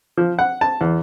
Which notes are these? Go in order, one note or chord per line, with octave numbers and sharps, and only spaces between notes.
F3
F#5
A5
E2